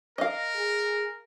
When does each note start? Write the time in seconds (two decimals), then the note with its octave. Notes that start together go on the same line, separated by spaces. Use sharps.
0.18 A#4 D#5 F5
0.55 G#4